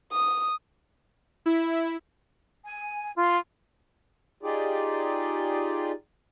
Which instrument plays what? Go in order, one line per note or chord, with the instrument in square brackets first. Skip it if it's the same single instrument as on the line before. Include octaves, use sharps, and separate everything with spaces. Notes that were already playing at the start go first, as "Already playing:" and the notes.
[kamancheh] D#6
[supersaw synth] E4
[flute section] G#5
F4
[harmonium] D#4 F4 G4 G#4 D5